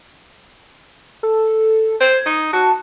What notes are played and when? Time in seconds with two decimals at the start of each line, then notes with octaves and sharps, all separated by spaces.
1.23 A4
2.00 C5 G#6
2.26 D#4
2.53 F#4 A5